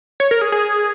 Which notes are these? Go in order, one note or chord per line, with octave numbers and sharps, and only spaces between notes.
C#5
A#4
G#4
G#4